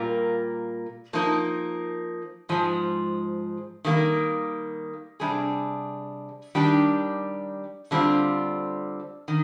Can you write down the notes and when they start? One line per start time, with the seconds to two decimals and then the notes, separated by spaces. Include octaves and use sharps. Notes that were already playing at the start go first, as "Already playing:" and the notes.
Already playing: A#2 G3 A#3 F4 A#4
1.13 F3 A#3 D#4 A#4
2.49 G#2 F3 G#3
3.85 D#3 G3 A#3
5.20 C3 G3 D4 G#4
6.55 D#3 G3 D4 G4
7.91 D3 G3 C4 F4
9.28 D#3